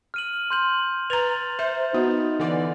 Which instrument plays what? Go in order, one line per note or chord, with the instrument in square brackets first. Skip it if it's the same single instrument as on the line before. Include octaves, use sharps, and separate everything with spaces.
[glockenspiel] F6 D#7 F#7
C6 G6 F#7
[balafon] B4 A#5 [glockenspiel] A6 F7
[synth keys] C5 [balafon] E5
[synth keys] B3 [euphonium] D#4 [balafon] F#4
[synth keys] D3 E3 D5